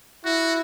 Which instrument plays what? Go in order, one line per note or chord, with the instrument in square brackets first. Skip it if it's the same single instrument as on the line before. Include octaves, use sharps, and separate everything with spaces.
[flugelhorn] E4 [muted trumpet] F#4